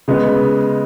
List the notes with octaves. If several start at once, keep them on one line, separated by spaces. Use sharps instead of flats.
C#3 G#3 B3